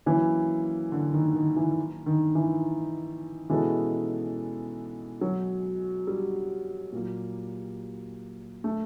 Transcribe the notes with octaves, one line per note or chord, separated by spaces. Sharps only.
E3 F#3 A#3 C#4
D3
D#3
D#3
E3
D#3
E3
B2 E3 G#3 C#4 F#4 A4
F#3
G3
A#2 F#3 A#3
A3